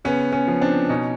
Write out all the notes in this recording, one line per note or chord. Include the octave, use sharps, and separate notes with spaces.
C#3 B3 C#4
B3 C#4
F3
C4 D4
B2 C#4 D#4